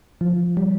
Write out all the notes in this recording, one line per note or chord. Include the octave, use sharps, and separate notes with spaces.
F3
G3